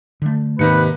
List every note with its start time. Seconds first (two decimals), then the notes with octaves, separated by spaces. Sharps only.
0.22 D3 A3
0.59 D#2 G#2 C3 D#3 D#4 B4 C#7